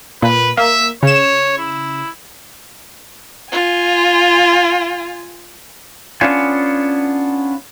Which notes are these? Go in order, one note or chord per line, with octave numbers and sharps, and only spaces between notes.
A#2 B4
A#3 E5
C#3 C#5 E7
E4
F4 G#5
B3 C#4 D4 F4 G#5